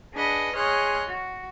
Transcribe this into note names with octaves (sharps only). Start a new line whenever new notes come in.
D4 G#4 B4 D#5 F#5
G#4 C#5 D#5 C6 F6 F#6
F#4